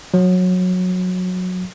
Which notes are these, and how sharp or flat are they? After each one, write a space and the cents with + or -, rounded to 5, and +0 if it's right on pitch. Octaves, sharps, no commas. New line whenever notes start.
F#3 -20